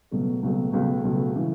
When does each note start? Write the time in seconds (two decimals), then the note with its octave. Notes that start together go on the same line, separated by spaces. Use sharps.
0.11 C#2 B2 F#3 A3
0.43 C#2 B2 F#3 A3
0.72 C#2 B2 F#3 A3
1.03 C#2 B2 F#3 A3
1.35 C#3 E3